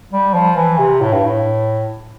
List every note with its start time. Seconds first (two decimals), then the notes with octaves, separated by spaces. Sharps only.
0.12 G3
0.34 F3
0.56 E3
0.79 C3
1.01 A2
1.13 G2
1.25 A2